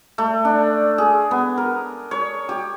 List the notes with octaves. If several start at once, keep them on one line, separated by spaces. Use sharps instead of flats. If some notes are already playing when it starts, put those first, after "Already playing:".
A3
D4
G#4
B3
A#4
C#5
G4